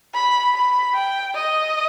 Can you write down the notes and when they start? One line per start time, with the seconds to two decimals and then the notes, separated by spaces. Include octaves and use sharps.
0.15 B5
0.55 B5
0.94 G5
1.35 D#5